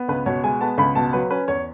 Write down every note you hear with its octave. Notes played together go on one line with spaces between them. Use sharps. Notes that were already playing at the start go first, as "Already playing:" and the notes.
Already playing: B3
C#2 B4
B2 C#5
G#3 G#5
B3 A5
C#2 B5
B2 A5
F#3 B4
C#4 B4
E2 C#5